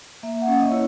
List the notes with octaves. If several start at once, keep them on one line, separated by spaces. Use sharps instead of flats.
A#3 E5
F#5
C#4
D#5
E4 C#5